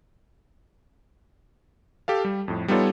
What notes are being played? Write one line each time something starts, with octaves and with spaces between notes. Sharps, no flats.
G4 A4 F5
G3
F2 A2
G3 B3 D#4 F4 A4 C#5